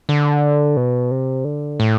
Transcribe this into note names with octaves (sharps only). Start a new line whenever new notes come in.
D3
B2
C3
D3
A2